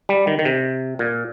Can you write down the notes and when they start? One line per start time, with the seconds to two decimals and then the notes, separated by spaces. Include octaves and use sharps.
0.09 G3
0.27 D#3
0.39 D#3
0.45 C3
0.99 A#2